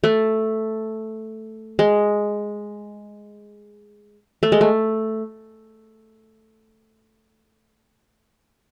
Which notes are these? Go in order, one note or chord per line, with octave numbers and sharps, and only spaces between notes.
A3
G#3
A3
G#3
A3